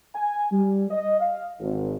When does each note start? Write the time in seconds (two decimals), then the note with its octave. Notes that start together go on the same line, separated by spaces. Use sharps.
0.13 G#5
0.51 G3
0.90 D#5
1.19 F5
1.59 G#1